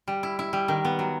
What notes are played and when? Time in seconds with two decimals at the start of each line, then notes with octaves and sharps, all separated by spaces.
0.08 G3
0.23 E4
0.39 E4
0.53 G3
0.68 D#3
0.85 B3
0.99 F#3